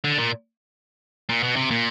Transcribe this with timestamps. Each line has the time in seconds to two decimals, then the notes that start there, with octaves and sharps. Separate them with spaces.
0.04 D3
0.18 A#2
1.29 A#2
1.43 B2
1.56 C3
1.71 A#2